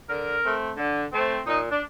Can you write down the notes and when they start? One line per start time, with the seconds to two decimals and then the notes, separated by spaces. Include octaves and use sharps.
0.08 D3 A#4
0.44 A3 C4
0.77 D3
1.12 A3 C4
1.47 A#2 D#4
1.70 D4